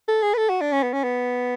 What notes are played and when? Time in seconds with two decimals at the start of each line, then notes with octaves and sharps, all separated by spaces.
0.08 A4
0.23 G#4
0.34 B4
0.37 A4
0.49 F#4
0.61 D4
0.72 C#4
0.83 B3
0.93 C#4
1.04 B3